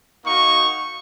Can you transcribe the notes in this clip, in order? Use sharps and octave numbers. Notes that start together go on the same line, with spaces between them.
A#3 D#4 F#4 C#6